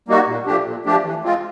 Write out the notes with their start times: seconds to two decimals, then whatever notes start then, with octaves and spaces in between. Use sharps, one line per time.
0.08 G3 A#3 D#4 F#4
0.27 A#2
0.46 F3 A3 D4 G4
0.65 A#2
0.86 F3 A3 D4 G4
1.05 E3
1.24 G#3 C4 F4